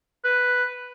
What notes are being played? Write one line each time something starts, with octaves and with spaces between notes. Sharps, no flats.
B4